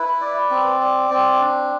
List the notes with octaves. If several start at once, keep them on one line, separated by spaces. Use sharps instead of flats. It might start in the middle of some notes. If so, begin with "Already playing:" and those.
Already playing: E4 B4
D5
C4
D5
C4
D4